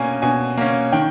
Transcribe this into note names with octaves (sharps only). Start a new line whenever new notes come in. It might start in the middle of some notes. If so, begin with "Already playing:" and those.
Already playing: B2 A#3 C#4 G#5
B2 G#5
A#3 C#4
D#3 G5